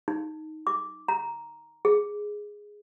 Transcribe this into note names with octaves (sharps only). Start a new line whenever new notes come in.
D#4
D6
A#5
G#4